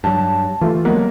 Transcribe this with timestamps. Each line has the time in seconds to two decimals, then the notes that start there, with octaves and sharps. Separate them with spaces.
0.04 G2 F#3 A5
0.61 E3 A3 F4
0.85 F#3 G#3 A#3 B3